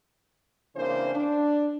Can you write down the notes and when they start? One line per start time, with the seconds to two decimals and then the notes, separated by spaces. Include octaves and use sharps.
0.76 C#3 E3 A#3 C4 D4 C5
1.15 D4